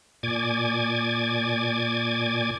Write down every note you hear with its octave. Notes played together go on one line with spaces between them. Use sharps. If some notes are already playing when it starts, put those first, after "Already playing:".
A#2 D5 G#5 D6 G#6